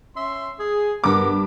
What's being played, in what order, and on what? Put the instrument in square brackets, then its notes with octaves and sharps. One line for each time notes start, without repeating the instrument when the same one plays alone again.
[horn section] C#4 E5 C6
G#4
[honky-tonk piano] G2 D6 [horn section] B3 A#4